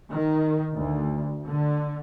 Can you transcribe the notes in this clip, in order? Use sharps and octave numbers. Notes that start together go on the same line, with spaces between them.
D#3
D2
D3